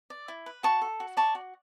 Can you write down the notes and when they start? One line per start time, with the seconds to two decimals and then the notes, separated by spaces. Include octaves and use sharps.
0.10 D5
0.28 E4
0.46 B4
0.63 F#4 A5 C#6
0.82 A4
1.00 F#4
1.17 D5 A5 C#6
1.35 F#4